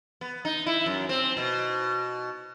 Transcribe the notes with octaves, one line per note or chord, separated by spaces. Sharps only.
B3
D#4
E4
F#2
C4
B2